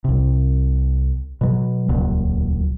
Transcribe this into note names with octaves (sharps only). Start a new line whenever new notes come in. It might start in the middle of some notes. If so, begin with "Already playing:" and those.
C2 C3
B2 F#3
D#1 C#2 A#2 F#3